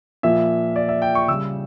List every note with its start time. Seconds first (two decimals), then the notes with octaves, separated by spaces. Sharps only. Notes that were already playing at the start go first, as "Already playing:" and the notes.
0.23 A#2 F3 E5
0.76 D5
0.89 E5
1.02 G5
1.15 C#6
1.28 C#3 G3 E6